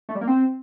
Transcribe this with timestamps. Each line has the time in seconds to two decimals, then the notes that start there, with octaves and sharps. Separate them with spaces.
0.09 A3
0.15 G3
0.21 A#3
0.27 C4